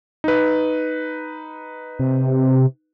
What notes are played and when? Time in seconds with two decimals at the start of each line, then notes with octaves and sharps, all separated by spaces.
0.24 D#4 B4
1.99 C3